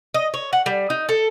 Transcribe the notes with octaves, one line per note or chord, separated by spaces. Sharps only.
D#5
C#5
F#5
G3
D#4
A4